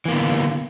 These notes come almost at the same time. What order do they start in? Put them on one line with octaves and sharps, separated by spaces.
E3 A#3 B3 D3